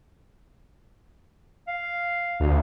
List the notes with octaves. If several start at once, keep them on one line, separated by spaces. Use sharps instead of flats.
F5
D2